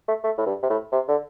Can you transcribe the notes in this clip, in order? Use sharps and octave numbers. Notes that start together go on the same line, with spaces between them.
A3
A3
A2
G2
C3
A2
C3
D3